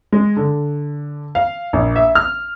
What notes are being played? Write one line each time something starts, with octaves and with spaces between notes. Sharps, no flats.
G#3
D3
F5
A#1
E5
F6